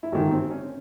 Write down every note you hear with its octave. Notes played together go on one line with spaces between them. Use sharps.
E4
A1 G#2 D#3 F#4
C4
C#4